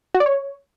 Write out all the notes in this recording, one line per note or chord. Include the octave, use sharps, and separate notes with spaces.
F#4
D5
C#5